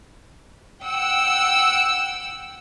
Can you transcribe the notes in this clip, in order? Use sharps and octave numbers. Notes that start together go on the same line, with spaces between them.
F#5 G5 E6